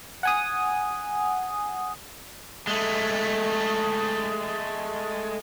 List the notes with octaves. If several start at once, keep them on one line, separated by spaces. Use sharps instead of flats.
F#5 G#5 D#6
G#3 A3